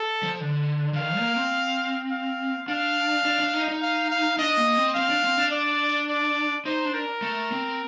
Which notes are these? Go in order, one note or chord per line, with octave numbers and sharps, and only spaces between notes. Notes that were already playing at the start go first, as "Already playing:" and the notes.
Already playing: A4
F3
D3
D3
D#3 F5
A#3
C4
F5
D4 F5
D4
D4
D#4
D#4
F5
F5
D4 D#5
A#3
C4
C4 F5
D4
C4
D4
D5
D5
D#4 C5
D4
A#4
A3
C4